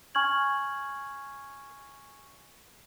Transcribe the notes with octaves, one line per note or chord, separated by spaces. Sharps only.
G#5 C#6 F6 G#6 F#7